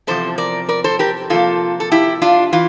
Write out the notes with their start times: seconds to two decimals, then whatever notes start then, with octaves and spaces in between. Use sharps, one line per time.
0.07 E2 C3 F3 A4 C5
0.38 A#4 D5
0.69 A#4 D5
0.84 A4 C5
0.99 G4 A#4
1.30 C3 F3 A#3 F4 A4
1.80 A4
1.92 E4 G4
2.22 D4 F4
2.52 E3 F4